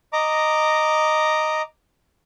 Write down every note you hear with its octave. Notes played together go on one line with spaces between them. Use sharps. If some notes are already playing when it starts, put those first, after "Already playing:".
D#5 A#5 D6